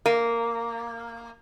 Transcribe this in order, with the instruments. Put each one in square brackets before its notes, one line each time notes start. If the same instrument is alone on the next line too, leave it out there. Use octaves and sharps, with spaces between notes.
[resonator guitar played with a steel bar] A#3